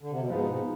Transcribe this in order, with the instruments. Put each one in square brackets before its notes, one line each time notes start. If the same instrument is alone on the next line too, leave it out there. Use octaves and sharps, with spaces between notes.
[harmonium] D3
C3
B2
[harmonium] G#2 [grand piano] F3 B3 D#4
[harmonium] B2